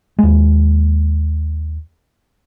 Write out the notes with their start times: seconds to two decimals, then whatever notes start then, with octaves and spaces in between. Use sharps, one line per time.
0.19 D#2 G#3